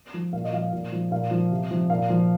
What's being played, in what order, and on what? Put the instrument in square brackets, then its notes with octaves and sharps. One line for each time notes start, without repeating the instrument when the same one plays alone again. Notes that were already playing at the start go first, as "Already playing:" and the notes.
[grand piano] F3
A#2 F5
D#5
F3 F5
A#2
F3
A#2 F5
F3
C3
F3
A#2 F5
F3